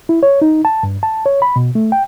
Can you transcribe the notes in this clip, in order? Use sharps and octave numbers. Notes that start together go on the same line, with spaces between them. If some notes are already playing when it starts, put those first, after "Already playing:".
E4
C#5
D#4
A5
G2
A5
C#5
B5
B2
A3
G5